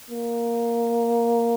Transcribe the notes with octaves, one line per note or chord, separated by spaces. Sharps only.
A#3